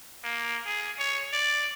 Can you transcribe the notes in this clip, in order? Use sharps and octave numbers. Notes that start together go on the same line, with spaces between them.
A#3
G#4
C#5
D5